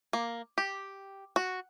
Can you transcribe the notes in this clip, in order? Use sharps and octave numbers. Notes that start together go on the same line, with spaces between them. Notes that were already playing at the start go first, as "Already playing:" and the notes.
A#3
G4
F#4